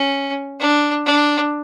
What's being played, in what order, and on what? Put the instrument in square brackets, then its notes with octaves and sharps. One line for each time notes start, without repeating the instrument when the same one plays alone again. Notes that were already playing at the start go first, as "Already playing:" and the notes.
Already playing: [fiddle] C#4
D4
D4